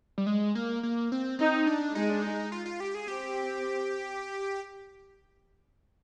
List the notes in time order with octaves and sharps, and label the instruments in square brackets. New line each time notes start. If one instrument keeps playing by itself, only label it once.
[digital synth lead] G3
G#3
A#3
A#3
C4
[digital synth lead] C4 [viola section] D#4
[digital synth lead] D4
[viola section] G#3 [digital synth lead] D#4
[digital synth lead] D4
D#4
F4
F4
G4
G#4
[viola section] C4 [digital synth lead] G4